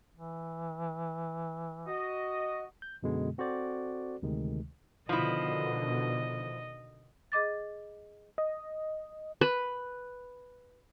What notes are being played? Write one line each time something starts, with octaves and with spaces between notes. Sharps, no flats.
E3
F#4 D#5
G6
F#2 B2 D3 G#3 B3
C4 F#4 A4 C5 D5
D2 C3 D#3 G#3
B2 D3 D#3 F3 E4 D#5
G#4 D#5 D6 A6
D#5
B4